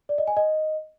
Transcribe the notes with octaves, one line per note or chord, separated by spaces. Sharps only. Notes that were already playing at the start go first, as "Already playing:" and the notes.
D5
D#5
G#5
D#5